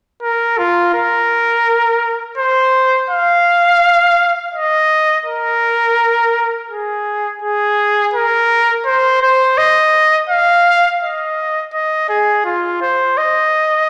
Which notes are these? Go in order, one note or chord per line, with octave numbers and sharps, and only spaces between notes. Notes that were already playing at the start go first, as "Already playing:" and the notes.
A#4
F4
A#4
C5
F5
D#5
A#4
G#4
G#4
A#4
C5
C5
D#5
F5
D#5
D#5
G#4
F4
C5
D#5